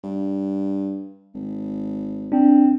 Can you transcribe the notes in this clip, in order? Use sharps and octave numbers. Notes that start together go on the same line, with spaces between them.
G2
G#1
C4 D4